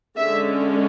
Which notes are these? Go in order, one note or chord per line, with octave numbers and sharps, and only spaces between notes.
D3 G#3 C#4 E5